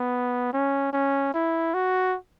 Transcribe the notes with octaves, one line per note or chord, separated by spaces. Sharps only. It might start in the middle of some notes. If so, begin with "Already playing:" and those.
Already playing: B3
C#4
C#4
E4
F#4